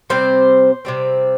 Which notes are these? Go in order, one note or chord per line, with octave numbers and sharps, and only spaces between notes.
C3 G3 C4 C5
C3 G3 C4